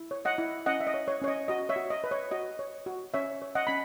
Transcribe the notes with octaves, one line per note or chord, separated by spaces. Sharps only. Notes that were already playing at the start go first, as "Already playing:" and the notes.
Already playing: E4
C#5
D#5 F#5
E4
C#4 D#5 F#5
E5
D#5
C#5
C#5
C#4 C#5
D#5
F#4 D#5
C#5 E5
F#4
D#5
B4
C#5
F#4 D#5
C#5
F#4
C#4 C#5 E5
C#5
D#5 F#5
C#4 B5